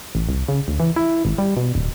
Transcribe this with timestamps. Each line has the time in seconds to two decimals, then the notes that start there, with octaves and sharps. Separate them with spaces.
0.15 A1
0.29 C2
0.48 C#3
0.68 D2
0.80 E3
0.96 E4
1.25 G#1
1.38 G3
1.57 B2
1.75 D1